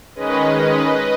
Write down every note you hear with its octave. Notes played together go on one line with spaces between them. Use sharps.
D#3 G#3 C#4 B4 D#5
B4 D#5